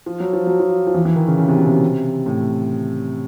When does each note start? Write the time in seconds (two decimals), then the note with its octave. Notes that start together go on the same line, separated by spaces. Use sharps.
0.06 F3
0.20 F#3
0.33 F3
0.47 F#3
0.60 F3
0.87 F3
0.94 E3
1.05 E3
1.16 D#3
1.28 C#3
1.38 C#3
1.48 C3
1.57 B2
1.66 C3
2.26 A2